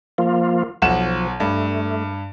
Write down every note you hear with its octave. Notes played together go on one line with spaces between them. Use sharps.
F3 A#3 F4
B1 F3 F#5 E7
G2 A3